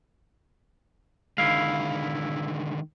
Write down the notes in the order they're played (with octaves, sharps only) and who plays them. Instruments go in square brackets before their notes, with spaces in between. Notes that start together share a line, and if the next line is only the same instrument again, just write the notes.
[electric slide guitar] D3 D#3 G#3 [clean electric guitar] E4 F5